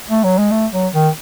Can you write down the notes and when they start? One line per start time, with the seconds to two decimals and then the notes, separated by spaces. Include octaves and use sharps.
0.09 A3
0.24 F#3
0.38 G#3
0.51 A3
0.73 F#3
0.94 D#3